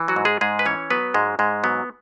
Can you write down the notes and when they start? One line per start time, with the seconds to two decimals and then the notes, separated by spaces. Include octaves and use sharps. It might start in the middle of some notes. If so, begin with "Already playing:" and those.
Already playing: E3
0.08 F#3 F#4
0.16 G#2
0.25 G#3 G#4
0.41 G#2 G#3 G#4
0.59 B4
0.65 E3 C#4 C#5
0.90 F#3 B3 B4
1.14 G#2 G#3
1.39 G#2 G#3
1.64 F#3 B3